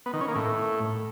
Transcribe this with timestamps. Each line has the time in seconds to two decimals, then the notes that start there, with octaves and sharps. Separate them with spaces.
0.06 B3
0.13 D#3
0.21 C#4
0.28 A#3
0.35 A2